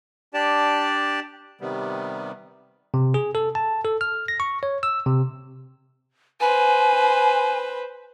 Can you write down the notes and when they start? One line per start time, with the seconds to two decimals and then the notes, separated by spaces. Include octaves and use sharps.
0.34 D4 G4 D5 A5
1.61 C3 D#3 G3 B3
2.94 C3
3.14 G#4
3.35 A4
3.55 A5
3.85 A4
4.01 F6
4.28 A#6
4.40 C#6
4.63 C#5
4.83 E6
5.06 C3
6.41 B4 C5 G#5